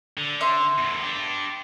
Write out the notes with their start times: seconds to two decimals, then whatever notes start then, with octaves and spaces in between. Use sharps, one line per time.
0.18 D3
0.41 E5 C6
0.78 E2 A2
1.02 D4 G4